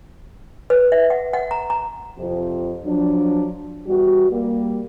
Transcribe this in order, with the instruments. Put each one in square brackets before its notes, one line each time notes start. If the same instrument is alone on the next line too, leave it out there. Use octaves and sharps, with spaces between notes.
[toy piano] B4
E5
F#5
F#5
A#5
A#5
[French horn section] F2 C3 F3
F3 F#3 D4
E2 G3 F#4
G3 A#3